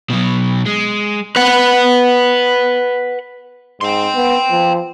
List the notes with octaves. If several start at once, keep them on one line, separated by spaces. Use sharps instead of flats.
B2 F#3
G#3
B4 F#5
G#2 G5 C6
B3
F3